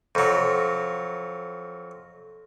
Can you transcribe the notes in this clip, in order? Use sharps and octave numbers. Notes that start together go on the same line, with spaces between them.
F2 F#3